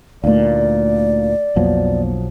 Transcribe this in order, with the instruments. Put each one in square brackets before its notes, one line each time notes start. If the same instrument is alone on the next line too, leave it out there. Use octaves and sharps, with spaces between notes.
[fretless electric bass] D2 A#2 [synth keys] A3 D#4 F5 [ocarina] D5
[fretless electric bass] B1 F3 F#3 [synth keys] F2 A#3 B3